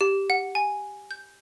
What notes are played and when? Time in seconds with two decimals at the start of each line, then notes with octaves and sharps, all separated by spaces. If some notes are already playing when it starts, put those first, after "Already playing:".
0.01 G4
0.30 F#5
0.55 G#5
1.11 G6